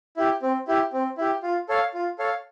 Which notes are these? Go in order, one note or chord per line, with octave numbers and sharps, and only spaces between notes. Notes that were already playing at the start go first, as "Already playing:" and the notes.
E4 G4
C4
E4 G4
C4
E4 G4
F4
A4 C#5 F5
F4
A4 C#5 F5